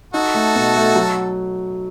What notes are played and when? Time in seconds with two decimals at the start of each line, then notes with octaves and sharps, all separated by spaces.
0.14 D#4 F#4 A4
0.35 A3
0.55 B2
0.76 A3
0.96 F#3